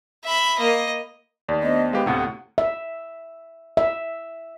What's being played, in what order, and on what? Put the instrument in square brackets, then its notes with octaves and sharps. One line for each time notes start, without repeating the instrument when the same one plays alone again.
[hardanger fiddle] E5 B5
A#3 D#5
[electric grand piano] D#2 [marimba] A3 G4 [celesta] D5
[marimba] B3 D4 C5 [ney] D#5
[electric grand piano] G#3 G4 [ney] B4 [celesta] F5
[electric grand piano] D2 A2 C3 [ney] F#5
[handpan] E5
E5